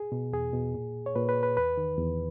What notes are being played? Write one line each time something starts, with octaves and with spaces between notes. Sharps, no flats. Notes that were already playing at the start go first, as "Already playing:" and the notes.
Already playing: G#4
B2
E2 G#4
B2
A#2
C#5
A#2 B4
B4
B4
E2 B4
D#3
E2